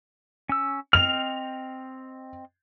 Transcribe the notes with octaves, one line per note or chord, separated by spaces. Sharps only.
C#4 E6
C4 D#5 F6 F7